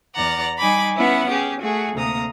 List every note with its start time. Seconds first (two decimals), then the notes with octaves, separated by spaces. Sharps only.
0.15 E2 D5 F#5 A#5
0.59 G3 D#4 G#5 B5 D6
0.97 B3 C#4 E4 B4 F#5
1.29 C#4 G4 G#4
1.61 A3 F#4 G#4
1.95 D2 C3 A#3 A#5 D#6